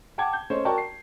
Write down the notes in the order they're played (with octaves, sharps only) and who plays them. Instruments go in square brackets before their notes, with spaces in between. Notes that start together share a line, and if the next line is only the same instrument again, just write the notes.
[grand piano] F#5 G5 A5 D6 G#6
G6
A3 C#4 C5 C#5 D#5
F#4 A#4 D5 G5 A5 C#6
C7